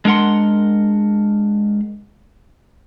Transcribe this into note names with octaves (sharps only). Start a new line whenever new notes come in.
G#3 D4 A#4 F#5 C6